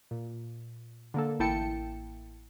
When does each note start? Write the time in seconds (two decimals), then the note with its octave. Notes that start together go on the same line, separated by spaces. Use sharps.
0.11 A#2
1.14 D3 A#3 A4
1.39 A1 A#3 E4 G5 A5 C#7